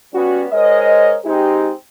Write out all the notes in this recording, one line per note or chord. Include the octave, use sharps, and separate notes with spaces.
G3 B3 C#4 F#4
G#3 A#4 C5 C#5 D#5
G#3 C4 D#4 G4